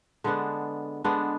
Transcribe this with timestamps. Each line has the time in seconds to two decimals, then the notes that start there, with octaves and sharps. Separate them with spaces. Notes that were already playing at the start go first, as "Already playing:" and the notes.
0.24 D3 G#3 B3 D4
1.04 D3 G#3 B3 D4